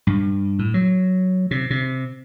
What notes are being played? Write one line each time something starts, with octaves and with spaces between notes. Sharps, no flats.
G2
A2
F#3
C3
C3